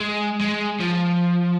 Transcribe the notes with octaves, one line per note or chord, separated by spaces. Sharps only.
G#3
G#3
F3